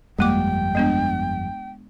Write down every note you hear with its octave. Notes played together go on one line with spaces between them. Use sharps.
G1 F2 G3 G#3 A#3 G5 D6
G#3 B3 D4